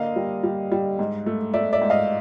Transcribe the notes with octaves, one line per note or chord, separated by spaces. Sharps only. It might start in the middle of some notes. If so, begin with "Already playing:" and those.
Already playing: D3 A#3 D#5 F5
G3
G3
G3
G#2
A3
A3 D5 E5
D5 E5
G#2
D#5 F5